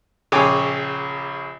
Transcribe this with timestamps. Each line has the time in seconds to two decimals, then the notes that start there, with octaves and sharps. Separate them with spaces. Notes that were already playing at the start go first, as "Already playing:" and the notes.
0.32 A#1 C#3 C#5 G5 G#5 D6